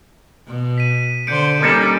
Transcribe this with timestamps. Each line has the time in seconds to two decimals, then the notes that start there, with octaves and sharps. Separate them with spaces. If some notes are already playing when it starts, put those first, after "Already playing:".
0.48 B2
0.78 B6 D#7
1.27 D3 C5 G6 C#7 D7
1.61 G3 A#3 C#4 D#4 A4